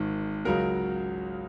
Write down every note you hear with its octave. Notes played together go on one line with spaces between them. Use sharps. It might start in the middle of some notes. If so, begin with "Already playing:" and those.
Already playing: G#1 G#2 D#3 G#3
C#2 C#3 F#3 A#4